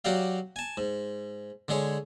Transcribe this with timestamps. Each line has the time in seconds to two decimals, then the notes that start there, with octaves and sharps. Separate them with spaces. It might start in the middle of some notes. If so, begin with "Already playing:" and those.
0.05 F#3 F#4 G4 D5 F5
0.56 G#5 A5
0.77 G#2
1.68 D3 G#3 G#4 C#5